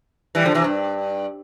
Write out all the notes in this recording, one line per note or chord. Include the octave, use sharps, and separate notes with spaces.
E3 G3
D3 F3
C3 E3
G2